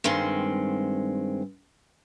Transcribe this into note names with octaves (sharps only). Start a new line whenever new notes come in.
G2 D#3 G#3 C4